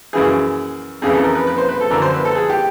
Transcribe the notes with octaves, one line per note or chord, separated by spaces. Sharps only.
F#2 C#3 E3 G#4
F2 C#3 E3 G#4
A4
A#4
B4
B4
C5
B4
A4
F#2 D3 A#4
C5
B4
A4
G#4
G4